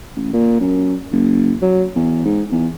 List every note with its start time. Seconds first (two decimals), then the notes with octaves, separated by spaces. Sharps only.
0.16 A1
0.33 A#2
0.60 F#2
1.12 F#1
1.62 F#3
1.96 E2
2.25 G#2
2.52 E2